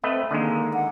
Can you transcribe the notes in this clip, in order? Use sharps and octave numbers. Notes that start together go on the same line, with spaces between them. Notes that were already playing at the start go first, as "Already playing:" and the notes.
A3 C4 B4 D#5
D3 D#3 G#3 A#3
F#5